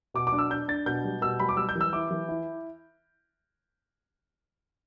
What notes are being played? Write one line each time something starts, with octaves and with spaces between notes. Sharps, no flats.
B2 D6
D6
D4
E6
D4 G6
D4 A6
B2 G6
G3
B2 E6
G3 B5
D6
G3 E6
G6
E3
E6
E4 D6
E3
E4